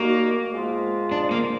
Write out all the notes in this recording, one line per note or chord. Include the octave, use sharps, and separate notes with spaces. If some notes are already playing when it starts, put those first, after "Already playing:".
Already playing: A#2 G#3 A#3 D#4 F#4
G#2 F3 G#3 B3 F4
D4
A#3